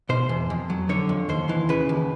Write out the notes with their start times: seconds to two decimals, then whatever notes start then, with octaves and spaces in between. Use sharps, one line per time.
0.09 B2 C5
0.29 E2
0.50 F2
0.70 F#3
0.89 D3 C#5
1.09 F2
1.29 D#2 C5
1.49 E3
1.69 C#3 B4
1.89 D#2